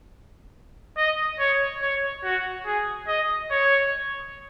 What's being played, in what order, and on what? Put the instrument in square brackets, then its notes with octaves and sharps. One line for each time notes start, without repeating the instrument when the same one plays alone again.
[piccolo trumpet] D#5
C#5
C#5
F#4
G#4
D#5
C#5